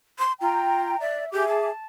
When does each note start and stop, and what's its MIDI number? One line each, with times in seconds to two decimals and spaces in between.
0.19 0.32 84
0.41 0.95 65
0.41 1.00 79
0.41 1.00 82
1.00 1.25 74
1.00 1.29 76
1.32 1.47 67
1.32 1.69 68
1.32 1.69 76
1.32 1.69 86
1.48 1.86 81